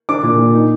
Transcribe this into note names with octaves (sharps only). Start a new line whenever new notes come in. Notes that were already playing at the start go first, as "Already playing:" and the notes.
D4 D6
A#2
A#2
D#4